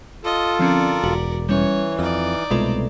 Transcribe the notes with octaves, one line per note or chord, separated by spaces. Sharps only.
F4 A4 D#5
D3 F3 C4 C#4 A#4 D5
E1 F#4
E3 G3 C#4 C#5
F2 D#4 D5 F6
C2 B2 G#3 A3 F4 A4